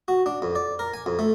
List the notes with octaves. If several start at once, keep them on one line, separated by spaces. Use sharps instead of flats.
F#4
D4
F2
D5
A#4
G#5
F2
A3